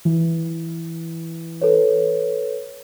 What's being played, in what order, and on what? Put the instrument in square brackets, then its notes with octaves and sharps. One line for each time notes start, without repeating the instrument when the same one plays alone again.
[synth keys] E3
[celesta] A4 B4 C#5